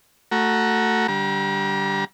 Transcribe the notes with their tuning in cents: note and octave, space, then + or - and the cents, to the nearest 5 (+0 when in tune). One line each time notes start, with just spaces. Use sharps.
A3 +15 F#4 +0 A#5 +25
D3 +0 G3 +0 A#5 +40